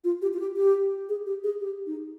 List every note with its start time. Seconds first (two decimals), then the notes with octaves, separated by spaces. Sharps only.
0.04 F4
0.22 G4
0.34 F4
0.39 G4
0.57 G4
1.09 G#4
1.27 G4
1.44 G#4
1.60 G4
1.87 D#4